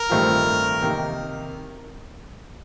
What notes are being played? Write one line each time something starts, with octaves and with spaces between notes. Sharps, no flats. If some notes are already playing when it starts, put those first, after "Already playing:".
Already playing: A#4
G2 D#3 A3 C4 F4
C3 D#3 A#3 D#4